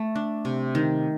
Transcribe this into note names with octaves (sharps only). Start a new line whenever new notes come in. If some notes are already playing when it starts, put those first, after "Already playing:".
Already playing: A3
D4
C3
D#3